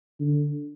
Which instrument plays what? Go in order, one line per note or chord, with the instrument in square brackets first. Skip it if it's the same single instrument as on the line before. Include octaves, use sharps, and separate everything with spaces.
[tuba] D3